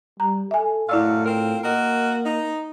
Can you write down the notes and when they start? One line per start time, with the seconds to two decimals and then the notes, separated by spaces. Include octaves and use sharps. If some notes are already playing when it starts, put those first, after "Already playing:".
0.20 G3 A#5
0.51 A4 E5 G#5
0.89 F#2 A2 A3 E4 D5 F5 E6
1.25 C4 F4 A#4
1.63 A#3 F#4 A#4 D#5
2.25 D#4